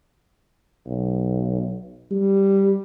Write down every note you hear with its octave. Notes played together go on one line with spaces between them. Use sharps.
B1
G3